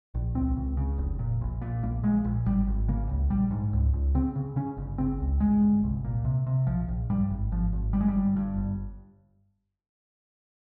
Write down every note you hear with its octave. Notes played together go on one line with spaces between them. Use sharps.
A#1
C#2 C4
C#2
C#3
F1
A#2
A#1
A#2
A#1 A#3
A#1 G#3
A#1
G#1 G3
G#1
C#3 A#3
C#2
A#1 G3
G#2
C#2
C#2
C#3 C4
C#3
C#3 C#4
G1
C#3 C4
C#2
G1 G#3
G1
C2
A#2
C3
C3
A#1 F3
A#1
G2 G3
G#1
G#1 F3
G#1
G1 G3
G#3
G3
G1
G2
G1